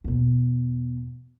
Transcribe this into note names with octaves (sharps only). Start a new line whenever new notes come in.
E2 B2